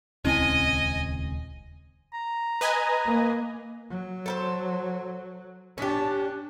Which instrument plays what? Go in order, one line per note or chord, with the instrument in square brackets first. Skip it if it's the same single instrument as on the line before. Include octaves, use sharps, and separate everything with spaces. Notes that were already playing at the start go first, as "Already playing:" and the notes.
[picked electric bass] D#1 C#2 C4 [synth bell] C#4 E4 D#7 [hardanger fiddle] D#5 G#5
[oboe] A#5
[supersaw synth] B4 D#5 G#5
[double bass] A#3
F#3
[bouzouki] A4 A#4 C5
[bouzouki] C#4 G4 [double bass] D4